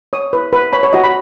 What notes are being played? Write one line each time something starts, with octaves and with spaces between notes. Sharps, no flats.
C#5 D#6
B4
B4
C#5 B5
C#5
F#4 D#5
B5